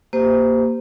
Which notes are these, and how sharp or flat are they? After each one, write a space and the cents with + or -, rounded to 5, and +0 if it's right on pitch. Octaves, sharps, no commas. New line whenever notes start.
A#3 +0 G4 +0 C5 -20